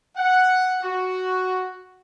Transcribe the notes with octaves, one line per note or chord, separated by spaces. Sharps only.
F#5
F#4